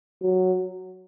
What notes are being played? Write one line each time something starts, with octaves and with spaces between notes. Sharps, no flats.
F#3